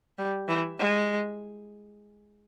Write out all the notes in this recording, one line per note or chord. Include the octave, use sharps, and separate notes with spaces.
G3
E3
G#3